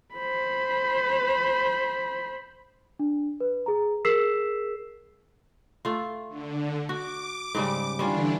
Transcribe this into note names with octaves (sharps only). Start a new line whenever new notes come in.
C5 B5
D4
B4
G#4 A#5
G#4 A#4 E6 B6 C7 E7
A3 F4
D3
F#4 D6
G#2 C#3 G3
D3 E3 G3 C#4 D4 F4